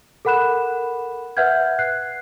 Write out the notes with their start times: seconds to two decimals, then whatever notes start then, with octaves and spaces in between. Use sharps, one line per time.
0.25 A4 A#4 F#5 B5 F#6 E7
1.37 B4 E5 F#5 F6 G6 G#6
1.79 F#6 C7